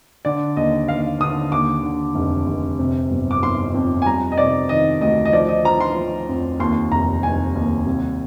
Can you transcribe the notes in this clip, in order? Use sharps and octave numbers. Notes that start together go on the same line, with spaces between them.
D3 D5
D#2 D#5
D#2 F5
D3 D#6
D#2 D6
D3
F1
F1
C3
G1
D6
G1 C6
F2
G#5
G3 A#5
D#5
C3 D5
D#3 D#5
D2 D#5
D#5
F3 D5
D#5
F3 A#5
C6
F3
F2
D#2 C6
F1 A#5
F1 G#5
D#2
C2